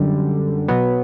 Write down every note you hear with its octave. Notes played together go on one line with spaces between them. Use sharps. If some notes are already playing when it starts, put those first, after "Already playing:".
Already playing: F#2 D3 G3
B2 F#3 B3